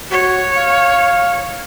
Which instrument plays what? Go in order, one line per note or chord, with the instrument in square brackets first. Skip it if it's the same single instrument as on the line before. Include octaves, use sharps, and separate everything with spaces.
[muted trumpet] F#4 [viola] C#5
[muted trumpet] F5